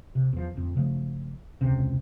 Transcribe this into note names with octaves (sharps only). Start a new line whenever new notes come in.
C3
E2 F3
D1 F2
G1 C#3 F3 A3
E1 C#2 C3